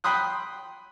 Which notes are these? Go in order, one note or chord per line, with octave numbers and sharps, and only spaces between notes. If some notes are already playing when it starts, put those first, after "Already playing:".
G5 B5 C6 D#6 F#6